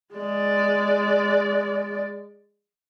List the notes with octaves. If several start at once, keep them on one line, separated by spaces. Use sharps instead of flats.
G#3 D5